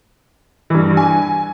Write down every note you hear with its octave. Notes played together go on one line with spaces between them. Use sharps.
G2 E3
G#5